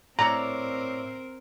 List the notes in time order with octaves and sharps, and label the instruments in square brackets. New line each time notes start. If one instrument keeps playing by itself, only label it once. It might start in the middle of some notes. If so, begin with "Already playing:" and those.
[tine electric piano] A2 E5 E6 [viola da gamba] C4 A#4 [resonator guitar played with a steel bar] C#5 D5 [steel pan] A#5